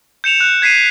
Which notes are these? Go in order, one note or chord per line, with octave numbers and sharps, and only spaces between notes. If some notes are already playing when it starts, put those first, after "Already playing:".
G6 C#7 E7 F7
F#6
G#6 B6 C7 D#7